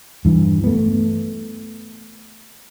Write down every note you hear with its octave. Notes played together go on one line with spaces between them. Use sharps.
G2 E3
A3 B3